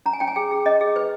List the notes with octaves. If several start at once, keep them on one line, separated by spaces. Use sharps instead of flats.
C#4 A#5
G#5
C#4 G5
G#5
G#4 G5
G#4
C#4 D#5
G#4
B4